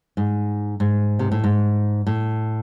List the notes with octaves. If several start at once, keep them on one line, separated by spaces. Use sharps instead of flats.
G#2
G#2
C3
A2
G#2
A2